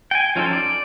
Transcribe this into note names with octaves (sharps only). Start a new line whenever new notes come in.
G5 G#5
F3 C#4 D#4 A4 C5
D5